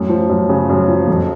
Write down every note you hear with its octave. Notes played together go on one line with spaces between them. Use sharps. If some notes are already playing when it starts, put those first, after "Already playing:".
Already playing: F#2 A2
F3
F#2
C#3
F#2
F3
F2